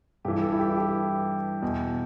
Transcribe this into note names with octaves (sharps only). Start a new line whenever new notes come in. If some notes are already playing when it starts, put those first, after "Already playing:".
G2 E3 G4
A4
E4
G4
E4
G4
E2 B2